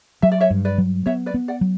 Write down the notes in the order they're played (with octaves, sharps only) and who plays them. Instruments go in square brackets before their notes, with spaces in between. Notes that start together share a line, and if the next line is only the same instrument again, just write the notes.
[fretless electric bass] F#3 [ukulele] E5
[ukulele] D5
C#5 E5
[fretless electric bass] G2
[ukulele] B4 D5
[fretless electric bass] F#3
[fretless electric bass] B3 [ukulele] C#5 E5
[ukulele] B4 D5
[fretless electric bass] B3
[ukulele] D5 F#5
[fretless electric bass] F#3